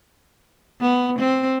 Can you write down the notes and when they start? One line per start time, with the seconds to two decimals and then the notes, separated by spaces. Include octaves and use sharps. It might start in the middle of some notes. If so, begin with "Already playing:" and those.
0.81 B3
1.19 C4